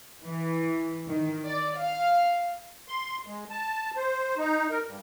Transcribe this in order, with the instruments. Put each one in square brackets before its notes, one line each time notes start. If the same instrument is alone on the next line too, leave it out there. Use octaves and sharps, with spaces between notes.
[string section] E3
D#3
D5
F5
[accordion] C6
G#3
A5
C5
D#4
A#4
G2